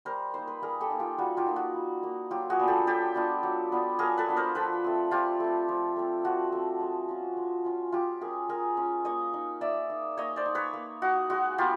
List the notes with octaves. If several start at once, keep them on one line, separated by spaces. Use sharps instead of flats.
G3 A#4 C5
A#3 D#4 C5
B4
G3 G#4 A#4
G4 A4
A#3 D#4
F4 G4
G3 F#4
F4 G4
A#3 D#4
F#4
G3
A#3 D#4
F#3 F4 G4
F#4 G#4
B3 D4 F4
G4 A4
F#3 G4 A4
B3 D4 F4
F#3
B3 D4 F4
F#3 G#4 A#4
A4 B4
B3 D4 F4
A#4 C5
F3 A4 B4
A3 C4
F3 F4 G4
A3 C4
F3
A3 C4
F3 F#4
A3 C4
G#3
C#4 F4
G#3
C#4 F4
G#3 F4 G4
C#4 F4 G#4 A#4
G#3 G#4 A#4
C#4 F4
A#3 C#5 D#5
D#4
A#3 D5 E5
D#4
A#3 C#5 D#5
C5 D5
D#4
B4 C#5
A#3
D#4 F#4
G#3 F#4
B3 F4 G4